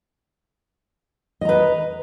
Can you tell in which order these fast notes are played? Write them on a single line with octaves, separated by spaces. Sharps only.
D#5 A#5 B4